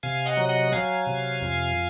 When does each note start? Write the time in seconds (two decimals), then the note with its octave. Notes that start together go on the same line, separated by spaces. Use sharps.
0.03 C3 F5 G#5
0.26 D#5 F#5
0.37 F#3
0.49 D#5 F#5
0.72 F#3 F5 G#5
1.07 C3
1.41 F2